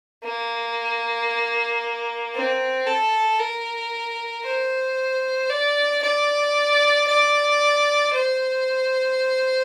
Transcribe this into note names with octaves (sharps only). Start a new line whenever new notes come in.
A#3
C4
A4
A#4
C5
D5
D5
D5
C5